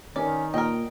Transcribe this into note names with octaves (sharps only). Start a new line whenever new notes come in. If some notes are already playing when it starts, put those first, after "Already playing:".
D#3 C#4 D5
A#2 A#4 D#5 G5